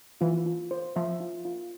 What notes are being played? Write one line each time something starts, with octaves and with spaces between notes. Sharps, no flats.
E3 F4
F4
C5
F3 E5
F4
F4